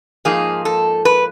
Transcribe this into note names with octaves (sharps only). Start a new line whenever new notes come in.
G#2 F3 A#3 D#4 G#4
A4
B4